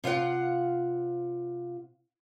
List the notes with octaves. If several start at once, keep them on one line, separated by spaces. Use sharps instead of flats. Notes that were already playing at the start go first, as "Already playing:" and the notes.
C3 F4 F5 F#5